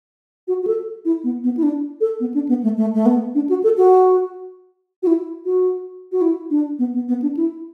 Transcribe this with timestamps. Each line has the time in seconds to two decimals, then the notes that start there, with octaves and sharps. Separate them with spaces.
0.48 F#4
0.63 F#4
0.67 A4
1.05 E4
1.24 B3
1.44 B3
1.57 E4
1.63 D4
2.01 A4
2.20 B3
2.34 D4
2.49 B3
2.63 A3
2.77 A3
2.94 A3
3.06 B3
3.35 D4
3.49 F#4
3.64 A4
3.77 F#4
5.03 F#4
5.07 E4
5.45 F#4
6.12 F#4
6.22 E4
6.51 D4
6.79 B3
6.94 B3
7.08 B3
7.22 D4
7.37 E4